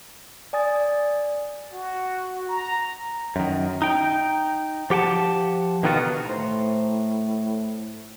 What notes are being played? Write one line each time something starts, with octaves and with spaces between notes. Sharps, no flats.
D5 G#5 D#6 A6
F#4
A#5
F#2 D#3
D#4 G5
F3 G4 F#5 G5 A5
B2 D3 D#3 B3 F4 F#4
A2 C5 A#5